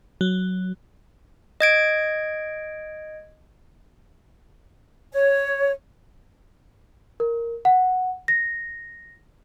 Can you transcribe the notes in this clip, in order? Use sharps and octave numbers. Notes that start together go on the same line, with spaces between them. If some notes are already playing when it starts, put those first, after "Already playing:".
F#3
D#5 G#6 D7
C#5
A#4
F#5
A#6